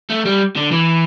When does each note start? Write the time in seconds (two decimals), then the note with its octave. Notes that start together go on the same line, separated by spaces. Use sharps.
0.10 A3
0.25 G3
0.56 D3
0.71 E3